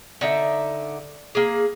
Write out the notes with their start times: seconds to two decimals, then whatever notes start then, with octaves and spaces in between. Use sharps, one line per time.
0.21 D3 D#4 E5
1.35 A#3 G#4